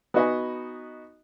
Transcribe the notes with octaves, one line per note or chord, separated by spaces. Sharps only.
B3 D#4 F#4 D#5 G#5 B5